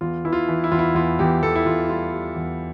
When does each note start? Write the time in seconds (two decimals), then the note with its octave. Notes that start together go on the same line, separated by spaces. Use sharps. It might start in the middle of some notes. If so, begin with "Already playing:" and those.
0.01 E2 F4
0.25 E3 E4
0.33 F4
0.48 E3
0.64 E4
0.71 E2 F4
0.79 E4
0.95 E2 F4
1.19 E2 G4
1.42 E2 A4
1.56 E4
1.66 E2 F4
1.89 G3 F4
2.13 G3
2.36 E2